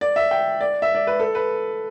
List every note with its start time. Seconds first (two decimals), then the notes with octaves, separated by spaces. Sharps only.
0.01 D5
0.16 E5
0.31 G5
0.61 D5
0.82 E5
0.95 D5
1.07 B4
1.20 A4
1.35 B4